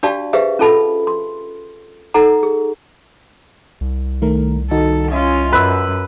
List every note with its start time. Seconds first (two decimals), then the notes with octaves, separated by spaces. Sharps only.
0.03 D4 F#4 G4 D5 F5 A5
0.33 G4 G#4 B4 C5 E5 F5
0.59 C#4 F4 A4 A5 B5
1.07 C6
2.14 D#4 A4 F#5 A#5
2.43 G#4
3.81 C2
4.22 D#3 A3 A#4
4.71 D#3 D#4 F#4 A4
5.11 C#4 F4 D#5 E5 G#5
5.53 F#2 B4 E6